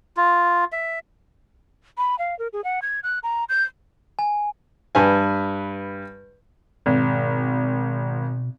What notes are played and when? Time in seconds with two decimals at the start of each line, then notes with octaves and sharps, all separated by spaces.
0.17 F4
0.72 E5
1.98 B5
2.19 F5
2.39 A#4
2.53 G#4
2.64 F#5
2.82 G#6
3.03 F#6
3.23 A#5
3.49 G6
4.19 G#5
4.95 G2 B4 G#5
6.86 G#1 B2